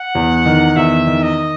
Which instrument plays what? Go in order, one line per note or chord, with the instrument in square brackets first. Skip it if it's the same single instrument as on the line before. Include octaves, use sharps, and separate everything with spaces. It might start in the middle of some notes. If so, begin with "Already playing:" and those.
Already playing: [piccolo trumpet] F#5
[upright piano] E2
D#3
[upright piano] E2 [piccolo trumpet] E5
[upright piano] D#3
[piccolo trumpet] D#5